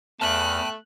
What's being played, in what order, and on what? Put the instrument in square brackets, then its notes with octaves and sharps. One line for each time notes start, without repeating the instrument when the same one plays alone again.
[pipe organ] E2 F6 [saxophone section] A3 [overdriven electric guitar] G5 A5 [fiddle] F#6